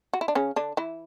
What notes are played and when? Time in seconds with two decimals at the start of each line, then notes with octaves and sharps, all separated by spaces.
0.13 F#4
0.21 E4
0.28 D4
0.35 C#3 C#4
0.56 D3 D4
0.77 E3 E4